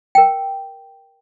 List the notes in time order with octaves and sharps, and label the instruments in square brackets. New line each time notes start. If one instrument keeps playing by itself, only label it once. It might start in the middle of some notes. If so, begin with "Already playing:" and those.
[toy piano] A#4 G5